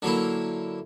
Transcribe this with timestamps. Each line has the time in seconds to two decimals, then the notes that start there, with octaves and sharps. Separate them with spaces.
0.02 D3 F#3 A#3 E4